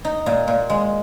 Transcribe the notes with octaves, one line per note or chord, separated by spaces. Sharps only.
D#4
A#2
A#2
G#3